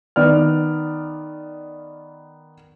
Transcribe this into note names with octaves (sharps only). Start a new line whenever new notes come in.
D#3 B3 D5 F6